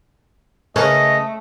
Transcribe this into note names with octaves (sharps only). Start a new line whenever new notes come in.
C#3 A3 C#4 A#4 B4 D#5